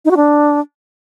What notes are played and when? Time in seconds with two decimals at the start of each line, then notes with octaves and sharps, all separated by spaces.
0.05 D#4
0.11 F#4
0.17 D4